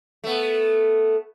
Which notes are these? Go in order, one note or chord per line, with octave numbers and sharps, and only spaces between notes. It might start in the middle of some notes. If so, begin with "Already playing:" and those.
A3 B3